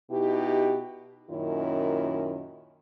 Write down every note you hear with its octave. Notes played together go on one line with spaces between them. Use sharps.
B2 D#4 E4 G4
F#2 A#2 D#3 C#4 E4